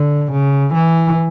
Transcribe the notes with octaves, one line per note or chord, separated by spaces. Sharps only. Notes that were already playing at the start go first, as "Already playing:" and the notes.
Already playing: D3
C#3
E3